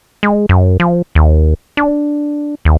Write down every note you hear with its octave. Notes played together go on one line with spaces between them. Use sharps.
G#3
F#2
F3
D#2
D4
D#2